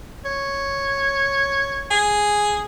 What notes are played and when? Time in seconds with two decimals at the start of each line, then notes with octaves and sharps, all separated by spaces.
0.25 C#5
1.91 G#4